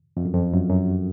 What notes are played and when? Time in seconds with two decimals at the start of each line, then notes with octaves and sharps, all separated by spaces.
0.17 F2
0.25 F#2
0.34 F2
0.53 F#2
0.70 F#2